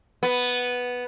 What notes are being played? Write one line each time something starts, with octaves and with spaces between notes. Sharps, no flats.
B3